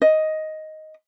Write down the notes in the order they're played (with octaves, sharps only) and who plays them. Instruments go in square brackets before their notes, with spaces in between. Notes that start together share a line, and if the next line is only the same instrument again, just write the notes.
[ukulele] D#5